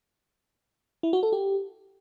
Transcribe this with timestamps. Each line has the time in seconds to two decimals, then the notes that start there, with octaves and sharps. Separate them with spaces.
1.03 E4
1.13 F#4
1.23 A4
1.33 G4